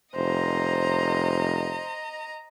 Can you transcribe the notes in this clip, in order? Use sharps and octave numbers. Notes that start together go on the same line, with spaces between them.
F1 C5 D#5 A#5